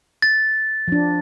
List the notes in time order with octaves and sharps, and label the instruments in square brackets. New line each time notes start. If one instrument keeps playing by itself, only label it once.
[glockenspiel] A6
[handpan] F3 D4